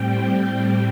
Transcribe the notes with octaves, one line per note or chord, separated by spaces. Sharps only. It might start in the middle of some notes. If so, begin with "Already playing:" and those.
Already playing: A2 G3 C4 G5
G5